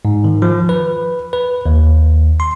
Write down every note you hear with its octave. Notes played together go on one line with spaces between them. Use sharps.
G#2
D#3
F3
B4
B4
D#2
C6